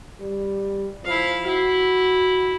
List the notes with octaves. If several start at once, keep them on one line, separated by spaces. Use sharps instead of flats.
G3
F3 E4 F5
E4 F#4